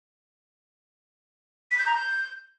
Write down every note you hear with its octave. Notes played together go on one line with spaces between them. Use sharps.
B6
G6
A#5
G6